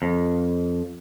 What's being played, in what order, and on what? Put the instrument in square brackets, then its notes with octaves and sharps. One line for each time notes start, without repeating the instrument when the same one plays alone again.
[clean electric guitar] F2